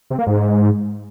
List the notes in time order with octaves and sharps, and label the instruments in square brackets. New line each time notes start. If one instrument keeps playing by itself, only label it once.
[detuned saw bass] C3
A#3
G#2